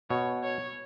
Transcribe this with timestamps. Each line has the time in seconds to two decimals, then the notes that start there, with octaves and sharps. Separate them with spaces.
0.10 B2 C#5
0.44 C#5